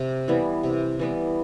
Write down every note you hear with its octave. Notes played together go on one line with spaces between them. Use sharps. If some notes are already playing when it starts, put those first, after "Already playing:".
Already playing: C3
E3 G3 B3
C3
E3 G3 B3